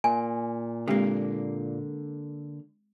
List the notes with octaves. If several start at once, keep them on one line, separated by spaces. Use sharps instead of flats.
A#2 G#5
D3 G#3 A#3 C4 G4